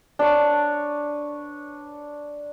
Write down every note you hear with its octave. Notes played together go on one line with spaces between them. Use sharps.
D4 B4 C#5